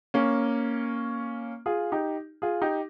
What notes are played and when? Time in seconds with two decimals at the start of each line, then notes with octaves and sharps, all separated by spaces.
0.14 A#3 C#4
1.66 F4 G#4
1.92 D#4 G4
2.42 F4 G#4
2.62 D#4 G4